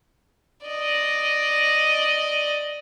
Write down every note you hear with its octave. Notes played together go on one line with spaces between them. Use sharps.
D5 D#5